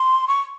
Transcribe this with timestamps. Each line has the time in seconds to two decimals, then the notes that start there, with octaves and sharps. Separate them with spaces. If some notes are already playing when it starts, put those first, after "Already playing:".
Already playing: C6
0.28 C#6